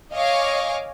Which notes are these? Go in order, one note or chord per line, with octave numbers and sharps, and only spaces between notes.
C#5 D#5 F5 G#5 C#6 D6